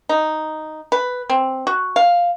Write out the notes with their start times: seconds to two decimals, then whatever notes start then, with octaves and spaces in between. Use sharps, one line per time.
0.09 D#4
0.92 B4
1.29 C4
1.67 F#4
1.96 F5